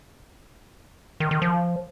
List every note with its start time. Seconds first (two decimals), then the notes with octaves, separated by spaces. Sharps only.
1.20 D#3
1.31 D#3
1.42 F3